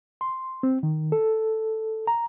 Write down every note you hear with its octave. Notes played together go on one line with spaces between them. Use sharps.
C6
C4
D#3
A4
A#5